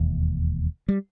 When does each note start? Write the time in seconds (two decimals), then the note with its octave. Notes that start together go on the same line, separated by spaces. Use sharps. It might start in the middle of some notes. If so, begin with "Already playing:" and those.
Already playing: E1 D#2
0.88 G3